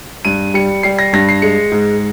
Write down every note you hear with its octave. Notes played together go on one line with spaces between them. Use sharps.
G2 D#7
G3 C#7
G3 C7
A#6
G2 A#6
C7
G#3 C#7
G#2